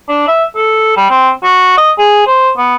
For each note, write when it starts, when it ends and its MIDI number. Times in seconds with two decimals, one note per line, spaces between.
0.09 0.23 62
0.28 0.45 76
0.56 0.92 69
0.97 1.06 55
1.10 1.30 60
1.43 1.74 66
1.78 1.92 75
1.98 2.24 68
2.27 2.51 72
2.58 2.76 59